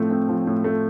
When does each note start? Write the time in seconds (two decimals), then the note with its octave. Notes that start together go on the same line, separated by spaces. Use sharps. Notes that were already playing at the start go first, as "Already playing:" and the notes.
Already playing: A2 F3 A3 C4
0.10 C4
0.29 F3
0.47 A2
0.64 A3